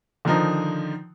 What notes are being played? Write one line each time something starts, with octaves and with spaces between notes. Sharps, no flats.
D3 D#3 F3 D#4